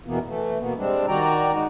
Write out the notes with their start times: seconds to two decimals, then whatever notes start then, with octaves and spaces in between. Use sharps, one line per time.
0.06 E2 B2 E3 A#3 B3
0.27 E3 A3
0.59 B2 A#3 B3
0.77 G3 G#3 C4 D4
1.08 D#3 F#4 D5 G5 A#5
1.52 G#3 D#4 F#4